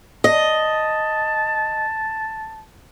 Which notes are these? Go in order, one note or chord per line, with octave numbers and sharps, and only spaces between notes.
D#5 A5